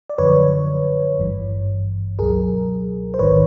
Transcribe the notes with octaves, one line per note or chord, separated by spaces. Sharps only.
D5
F#2 D3 F3 B4 C#5
G#1 G2 E3
C#2 B2 F#3 G#4 A#4
C5
A1 G#2 D#3 B4 C#5